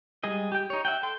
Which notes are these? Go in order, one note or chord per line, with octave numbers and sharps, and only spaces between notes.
G3 G#3 G#4 D#5
G4 G5
D#4 C#5
E5 F#5 G5
A4 G5 C6